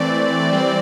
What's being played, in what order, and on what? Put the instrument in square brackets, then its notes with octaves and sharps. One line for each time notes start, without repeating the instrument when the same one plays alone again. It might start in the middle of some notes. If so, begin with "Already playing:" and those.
Already playing: [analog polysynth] E3 A3 C4 D5
E3 G3 C4